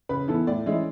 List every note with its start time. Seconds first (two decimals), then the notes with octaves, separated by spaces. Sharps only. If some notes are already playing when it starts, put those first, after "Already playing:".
0.09 C#3 B4
0.28 E3 B3 A4
0.47 A2 D5
0.66 E3 G#3 C#4 E4